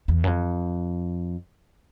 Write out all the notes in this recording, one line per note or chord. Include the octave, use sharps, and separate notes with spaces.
E2
F#2
F2